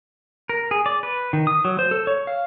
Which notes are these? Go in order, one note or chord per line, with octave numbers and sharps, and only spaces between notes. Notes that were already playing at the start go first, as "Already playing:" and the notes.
A#4
G#4
D5
B4
D#3
D#6
F#3
C5
A4
C#5
F5